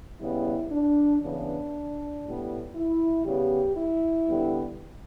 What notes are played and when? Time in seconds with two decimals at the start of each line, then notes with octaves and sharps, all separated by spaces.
0.20 C#3 G3 B3 E4
0.71 D4
1.22 C#3 E3 B3 D4
2.24 A2 G3 B3
2.75 E4
3.25 C#3 G3 B3 G4
3.77 E4
4.28 D3 G3 B3